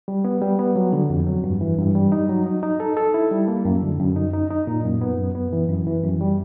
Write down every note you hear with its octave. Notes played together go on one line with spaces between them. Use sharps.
G3
B3
G3
B3
F#3
D3
F2
F#3
G2
E3
G2
G3
D#4
F#3
D#4
D#4
A4
A4
E4
G3
A#3
F#2
D3
F#2
D#4
D#4
D#4
A#2
F#2
B3
F#2
B3
E3
F#2
E3
F#2
G3